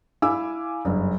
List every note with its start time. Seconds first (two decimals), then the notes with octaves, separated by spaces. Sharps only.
0.22 E4 F5 G#5 D6 E6
0.85 F#1 G2